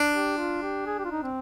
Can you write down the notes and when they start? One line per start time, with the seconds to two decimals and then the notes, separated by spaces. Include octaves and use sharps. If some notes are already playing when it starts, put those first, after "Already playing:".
Already playing: D4
0.13 G4
0.38 F4
0.62 G4
0.86 G#4
0.99 G4
1.05 F4
1.11 D#4
1.23 C4